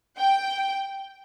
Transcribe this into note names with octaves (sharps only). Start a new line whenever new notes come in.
G5